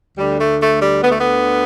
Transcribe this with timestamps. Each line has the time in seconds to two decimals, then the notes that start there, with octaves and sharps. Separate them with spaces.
0.18 D2 D3 G3
0.40 A3
0.61 A3
0.81 G3
1.03 D2 D3 B3
1.11 A3
1.19 B3